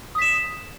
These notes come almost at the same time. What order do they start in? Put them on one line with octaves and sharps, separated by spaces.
D#6 B6 E7